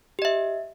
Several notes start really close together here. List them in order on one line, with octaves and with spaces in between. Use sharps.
G4 D#5 E5